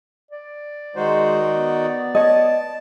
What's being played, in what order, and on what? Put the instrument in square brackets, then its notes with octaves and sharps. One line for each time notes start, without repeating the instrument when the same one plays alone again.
[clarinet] D5
[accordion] D#3 D#4 F#4 [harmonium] G#3 C5
[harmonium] B3
[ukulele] C#5 D#5 [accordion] A5